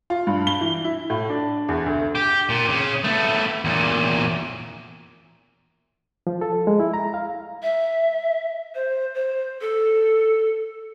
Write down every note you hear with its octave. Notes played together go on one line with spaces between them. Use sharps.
F4
G2
G7
E3
E4
A2
D4
E2
D2
G4
A#2
C#3
A3 B3
E2 A#2
F3
A4
G#3
E4
A#5
F5
E5
C5
C5
A4